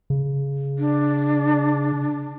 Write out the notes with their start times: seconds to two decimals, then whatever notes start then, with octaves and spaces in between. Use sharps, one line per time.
0.10 C#3
0.79 D4